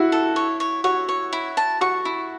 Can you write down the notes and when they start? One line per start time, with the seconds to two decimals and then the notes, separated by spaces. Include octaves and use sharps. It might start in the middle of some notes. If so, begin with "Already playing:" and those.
Already playing: E4 F#4 F#5
0.12 A4
0.36 C#5
0.60 C#5
0.84 F#4 C#5
1.09 C#5
1.33 E4
1.57 A5
1.81 F#4 C#6
2.05 E4